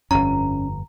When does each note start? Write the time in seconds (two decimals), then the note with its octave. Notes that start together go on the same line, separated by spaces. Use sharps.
0.11 G1 F2 C#4 A#5